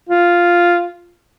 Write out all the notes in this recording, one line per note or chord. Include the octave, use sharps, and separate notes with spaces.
F4